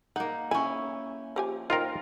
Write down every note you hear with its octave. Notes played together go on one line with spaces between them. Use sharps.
A#3 D#4 F#5
C#4 E4 G#5
F3 G4 G#5
D#4 F4 A#4 C5 G5